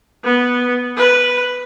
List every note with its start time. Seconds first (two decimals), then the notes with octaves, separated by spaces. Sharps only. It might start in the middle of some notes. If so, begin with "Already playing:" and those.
0.24 B3
0.97 B4